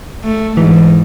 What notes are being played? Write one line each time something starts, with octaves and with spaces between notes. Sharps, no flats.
A3
G#2 E3